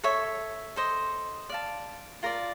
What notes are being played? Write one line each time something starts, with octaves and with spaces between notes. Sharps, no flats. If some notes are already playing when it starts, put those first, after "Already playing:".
A4 C#5 E5
A4 C5 D#5
D5 F5 A5
F4 A#4 D5